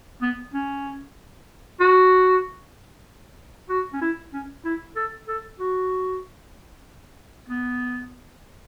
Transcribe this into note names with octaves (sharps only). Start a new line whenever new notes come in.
B3
C#4
F#4
F#4
C#4
E4
C#4
E4
A4
A4
F#4
B3